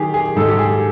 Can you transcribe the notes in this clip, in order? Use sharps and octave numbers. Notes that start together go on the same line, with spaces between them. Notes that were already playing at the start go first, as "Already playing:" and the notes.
Already playing: D#3 F#3 G4 G#4
G#4
G#2 A4
G4
G#4